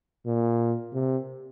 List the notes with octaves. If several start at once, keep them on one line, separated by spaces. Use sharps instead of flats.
A#2
C3